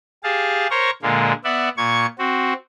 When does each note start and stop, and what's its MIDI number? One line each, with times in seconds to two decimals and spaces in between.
0.24 0.67 67
0.24 0.67 68
0.24 0.67 77
0.24 0.67 81
0.70 0.90 70
0.70 0.90 72
0.70 0.90 73
0.70 0.90 82
0.70 0.90 85
1.02 1.33 46
1.02 1.33 50
1.02 1.33 56
1.02 1.33 58
1.44 1.69 59
1.44 1.69 74
1.44 1.69 76
1.44 1.69 78
1.77 2.06 46
1.77 2.06 85
1.77 2.06 92
2.19 2.53 60
2.19 2.53 66